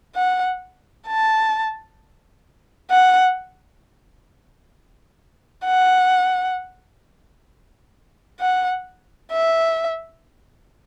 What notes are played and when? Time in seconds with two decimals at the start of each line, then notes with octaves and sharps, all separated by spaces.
0.15 F#5
1.07 A5
2.91 F#5
5.66 F#5
8.40 F#5
9.32 E5